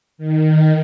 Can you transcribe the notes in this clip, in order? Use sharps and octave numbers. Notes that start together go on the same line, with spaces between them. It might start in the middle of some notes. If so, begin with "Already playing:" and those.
D#3